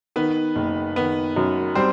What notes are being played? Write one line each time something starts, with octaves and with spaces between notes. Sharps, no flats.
D#3 B3 B4
F#1
D#3 B3 B4
F#2
G3 C4 C5